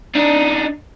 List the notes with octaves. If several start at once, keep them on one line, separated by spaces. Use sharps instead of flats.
D4 D#4